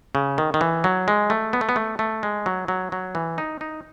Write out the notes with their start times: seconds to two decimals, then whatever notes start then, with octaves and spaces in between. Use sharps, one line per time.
0.15 C#3
0.38 D#3
0.54 D#3
0.61 E3
0.84 F#3
1.08 G#3
1.30 A3
1.53 B3
1.61 A3
1.69 B3
1.76 A3
1.99 A3
2.23 G#3
2.46 F#3
2.68 F#3
2.92 F#3
3.15 E3
3.38 D#4
3.61 D#4